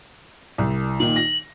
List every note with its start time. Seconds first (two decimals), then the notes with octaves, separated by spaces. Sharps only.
0.58 C2
1.00 A#2 D#3 F#7
1.16 A#6